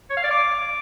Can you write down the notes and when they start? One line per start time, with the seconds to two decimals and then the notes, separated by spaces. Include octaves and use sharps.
0.10 C#5
0.17 F5
0.24 D5
0.31 D6